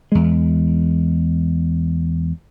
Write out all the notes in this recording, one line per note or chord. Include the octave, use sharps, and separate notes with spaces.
E2 G#3